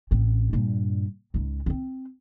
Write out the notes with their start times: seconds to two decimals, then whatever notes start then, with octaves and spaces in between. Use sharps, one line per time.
0.11 A1 C4
0.53 G2 A#2
1.34 C#2 G#2
1.66 B3 C4